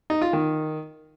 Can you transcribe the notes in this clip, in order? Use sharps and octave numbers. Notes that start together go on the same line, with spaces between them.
D#4
F4
D#3